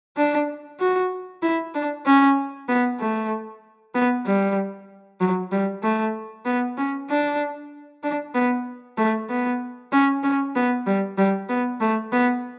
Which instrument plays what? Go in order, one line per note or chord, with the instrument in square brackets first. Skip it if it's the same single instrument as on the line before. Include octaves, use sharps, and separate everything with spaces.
[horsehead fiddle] D4
F#4
E4
D4
C#4
B3
A3
B3
G3
F#3
G3
A3
B3
C#4
D4
D4
B3
A3
B3
C#4
C#4
B3
G3
G3
B3
A3
B3